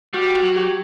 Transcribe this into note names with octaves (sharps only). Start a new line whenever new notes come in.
G3 F#4
F#4
F#3
G4